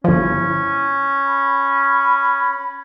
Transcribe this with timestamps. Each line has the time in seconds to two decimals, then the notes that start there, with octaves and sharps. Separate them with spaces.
0.04 G1 F3 C#4 E4
1.25 B5